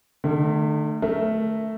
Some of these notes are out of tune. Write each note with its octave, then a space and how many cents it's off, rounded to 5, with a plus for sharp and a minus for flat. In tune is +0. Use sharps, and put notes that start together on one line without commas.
D#3 -45 A3 +5
A3 +0 A#4 +0 E5 +0